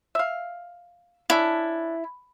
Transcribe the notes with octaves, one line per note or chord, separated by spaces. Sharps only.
E5 F5
C#4 D4 E4 A4